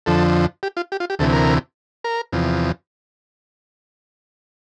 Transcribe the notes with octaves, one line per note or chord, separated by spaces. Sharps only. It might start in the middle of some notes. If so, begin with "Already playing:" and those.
F2 D3 F3 A4
G4
F4
G4
F4
G4
D2 C3 E3 A4
A#4
A#4
E2 C3 F3